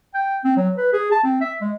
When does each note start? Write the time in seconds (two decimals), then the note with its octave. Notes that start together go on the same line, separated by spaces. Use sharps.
0.14 G5
0.44 C4
0.57 F#3
0.77 B4
0.93 G#4
1.12 A5
1.24 C4
1.41 E5
1.61 G#3